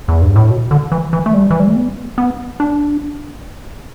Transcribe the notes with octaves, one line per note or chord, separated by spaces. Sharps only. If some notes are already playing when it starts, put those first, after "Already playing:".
E2
G2
A2
B2
D3
E3
E3
A3
G3
E3
G3
A3
B3
B3
D4